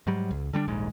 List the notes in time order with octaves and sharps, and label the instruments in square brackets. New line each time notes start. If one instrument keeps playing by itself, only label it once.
[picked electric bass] G#2 F#3 G3
C#2
D3 G3 C4 D4
D#1 A#1 G#2 G#3